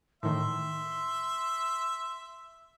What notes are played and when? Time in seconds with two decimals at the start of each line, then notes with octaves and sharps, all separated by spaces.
0.23 A2 D#3 E5 C6